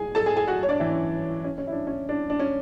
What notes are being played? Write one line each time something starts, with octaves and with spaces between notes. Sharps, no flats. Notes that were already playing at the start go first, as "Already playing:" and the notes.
Already playing: G#4 G#5
A4 A5
G#4 G#5
G#4 G#5
F#4 F#5
C#5
D4 D5
E3 E4
C#4
C#4
C#4
E4
D4
C#4
D4
D4
C#4